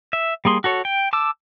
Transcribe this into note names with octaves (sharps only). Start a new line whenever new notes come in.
E5
G3 A#3 G#4 C6
F#4 A4 C#5
G5
A5 D6 E6